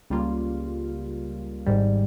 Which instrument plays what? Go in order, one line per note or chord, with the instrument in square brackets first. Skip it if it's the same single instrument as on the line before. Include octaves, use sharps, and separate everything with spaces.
[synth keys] C#2 C#3 G3 A#3 F4
G#1 G#2 G3